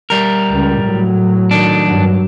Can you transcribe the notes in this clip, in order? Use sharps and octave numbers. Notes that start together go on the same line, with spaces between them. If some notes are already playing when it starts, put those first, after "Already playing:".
G3 A#4
C#2
A2 F#3
D#3 D4
G2 F#3